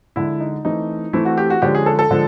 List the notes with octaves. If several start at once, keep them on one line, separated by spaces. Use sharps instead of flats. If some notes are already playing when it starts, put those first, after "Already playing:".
D3 F3 G#3 E4
D#4
E3 A3 C4 D#4
E3 A3 C4 E4
F#4
G4
F#4
D3 F3 G#3 C#4 G4
G#4
A4
A4
D3 F3 G#3